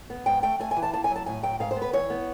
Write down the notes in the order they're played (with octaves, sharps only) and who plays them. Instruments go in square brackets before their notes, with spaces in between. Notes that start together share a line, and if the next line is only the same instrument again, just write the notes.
[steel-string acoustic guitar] B3
G#2 G5
A3 G5
A3 G#5
G#5
E3
A5
A#3 A5
G#5
F#3
A5
A2 G#5
F#3 G5
G#2 F5
C5
B3
B4
E3 C#5
B3